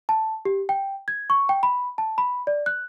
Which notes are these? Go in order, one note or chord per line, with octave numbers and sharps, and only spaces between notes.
A5
G4
G5
G#6
C#6
G5
B5
A5
B5
D5
F#6